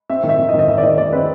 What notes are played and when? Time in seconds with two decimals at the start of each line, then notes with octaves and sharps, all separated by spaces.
0.10 C4 E5
0.23 D#3
0.29 E5
0.39 D#3
0.49 D#5
0.54 D#3
0.59 D#5
0.68 D#3 E5
0.78 D5
0.83 D#3 D#5
0.98 D#3 D5
1.12 C4 B4